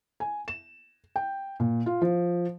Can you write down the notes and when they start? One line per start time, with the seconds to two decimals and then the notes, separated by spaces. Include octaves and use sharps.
0.20 G#5
0.48 E7
1.16 G5
1.60 A#2
1.86 F4
2.02 F3